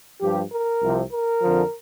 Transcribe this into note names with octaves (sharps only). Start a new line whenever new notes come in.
G2 F3 G4
A#4
C2 C3 F3
A#4
F2 D3 F3